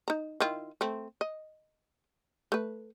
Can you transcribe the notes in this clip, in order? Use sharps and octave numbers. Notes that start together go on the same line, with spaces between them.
D#4 A#5
D#3 E4 F4
A3 C4
D#5
A3 B4